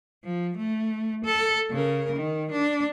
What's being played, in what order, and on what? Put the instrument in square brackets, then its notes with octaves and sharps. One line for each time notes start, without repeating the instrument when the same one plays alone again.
[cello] F3
A3
A4
C#3 A#4
D#3
D4